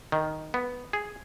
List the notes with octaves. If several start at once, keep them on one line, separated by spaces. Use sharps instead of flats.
D#3
B3
G#4